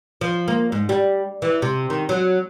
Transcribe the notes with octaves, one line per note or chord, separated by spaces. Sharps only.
F3
A#3
G#2
G3
E3
C3
D#3
F#3